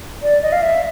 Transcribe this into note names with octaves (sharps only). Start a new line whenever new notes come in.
D5
D#5
F5
E5